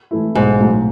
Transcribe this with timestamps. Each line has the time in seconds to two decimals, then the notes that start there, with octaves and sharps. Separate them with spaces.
0.11 E3 A3 E4
0.35 B1 G#2
0.60 A2 F#3